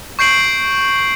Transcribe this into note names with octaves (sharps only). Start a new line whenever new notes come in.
C#6 G6 C7 D7 F#7